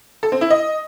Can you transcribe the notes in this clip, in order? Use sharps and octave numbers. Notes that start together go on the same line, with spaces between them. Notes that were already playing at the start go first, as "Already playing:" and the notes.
A4
C4
E4
D#5